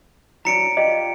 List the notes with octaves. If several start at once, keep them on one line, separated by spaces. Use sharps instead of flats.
E3 F#3 D4 A#5 C#7 D7
F4 G4 D5 D#5